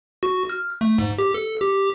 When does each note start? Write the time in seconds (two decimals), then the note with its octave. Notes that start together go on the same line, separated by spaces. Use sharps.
0.23 F#4
0.50 F6
0.81 A3
0.98 G#2
1.18 G4
1.34 A4
1.61 G4